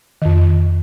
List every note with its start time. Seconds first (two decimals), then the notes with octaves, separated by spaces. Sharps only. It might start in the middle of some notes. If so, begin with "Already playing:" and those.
0.22 F2 D#3